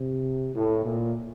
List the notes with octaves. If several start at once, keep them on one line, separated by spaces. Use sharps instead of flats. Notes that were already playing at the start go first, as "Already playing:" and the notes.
Already playing: C3
A2
A#2